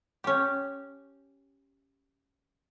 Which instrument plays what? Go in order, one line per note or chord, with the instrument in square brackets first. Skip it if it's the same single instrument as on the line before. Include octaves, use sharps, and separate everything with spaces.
[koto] C#4 G4